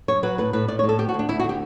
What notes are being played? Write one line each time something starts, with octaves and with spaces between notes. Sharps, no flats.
F#2 C#5
F#3 B4
A2 B4
A2 B4
A2 D5
C#5
A2
A4
D2 G4
F#4
D2
D4
D2 E4
F#4
D3
G4